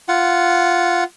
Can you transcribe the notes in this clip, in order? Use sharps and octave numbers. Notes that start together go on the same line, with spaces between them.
F4 F#5